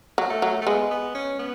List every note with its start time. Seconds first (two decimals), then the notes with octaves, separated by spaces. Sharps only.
0.18 F#3
0.30 A3
0.42 F#3
0.62 A3
0.67 G#3 B3
0.91 B3
1.15 C#4
1.39 B3